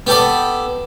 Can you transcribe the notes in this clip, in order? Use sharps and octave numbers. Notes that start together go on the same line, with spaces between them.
B3 G4 A4 D5